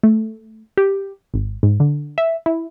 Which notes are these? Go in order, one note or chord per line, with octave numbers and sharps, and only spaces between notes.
A3
G4
G#1
G#2
D3
E5
E4